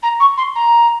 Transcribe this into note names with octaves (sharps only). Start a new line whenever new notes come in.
A#5
C#6
C6
A#5